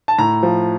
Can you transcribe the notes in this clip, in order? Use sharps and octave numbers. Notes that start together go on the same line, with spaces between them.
A5
A2 A#5
F3